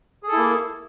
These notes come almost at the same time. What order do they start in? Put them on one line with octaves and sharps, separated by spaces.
G#4 A4 E4 A#3